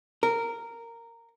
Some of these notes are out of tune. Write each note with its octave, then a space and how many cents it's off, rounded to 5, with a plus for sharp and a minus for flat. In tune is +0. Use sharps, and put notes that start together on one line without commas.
A#4 -10